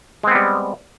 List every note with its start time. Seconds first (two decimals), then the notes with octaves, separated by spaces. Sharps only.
0.23 G#3
0.27 C4
0.31 B3
0.35 G3